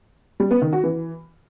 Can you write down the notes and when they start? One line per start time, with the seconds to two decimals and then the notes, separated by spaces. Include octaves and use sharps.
0.40 G3
0.51 B3
0.62 D#3
0.73 F#4
0.84 E3